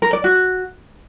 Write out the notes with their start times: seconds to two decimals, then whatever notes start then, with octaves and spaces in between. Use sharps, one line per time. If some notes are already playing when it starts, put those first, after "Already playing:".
0.02 A#4
0.13 D5
0.24 F#4